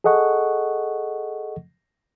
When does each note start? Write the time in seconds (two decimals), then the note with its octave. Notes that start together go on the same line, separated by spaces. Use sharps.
0.04 G#4 A4 D#5 F#5 C#6